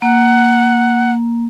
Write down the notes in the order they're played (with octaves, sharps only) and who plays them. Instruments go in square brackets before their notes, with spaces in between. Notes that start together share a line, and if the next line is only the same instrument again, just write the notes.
[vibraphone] A#3 [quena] F#5